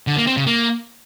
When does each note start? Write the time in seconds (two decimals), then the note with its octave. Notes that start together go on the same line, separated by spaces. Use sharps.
0.07 D3
0.17 A#3
0.27 C4
0.37 C#3
0.47 A#3